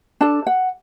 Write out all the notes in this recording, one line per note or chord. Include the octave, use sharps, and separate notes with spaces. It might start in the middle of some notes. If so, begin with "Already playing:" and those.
D4 A4 A5
F#5